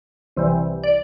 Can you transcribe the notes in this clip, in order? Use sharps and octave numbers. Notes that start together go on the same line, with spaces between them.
C2 C3 E3 G3
D5